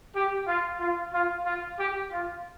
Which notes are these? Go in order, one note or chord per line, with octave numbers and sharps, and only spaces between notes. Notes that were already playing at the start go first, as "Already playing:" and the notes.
G4
F4
F4
F4
F4
G4
F4